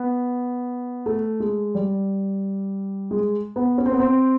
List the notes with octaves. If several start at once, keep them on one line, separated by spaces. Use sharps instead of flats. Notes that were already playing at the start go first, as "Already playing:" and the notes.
Already playing: B3
A3
G#3
G3
G#3
B3
C#4
C4
B3
C4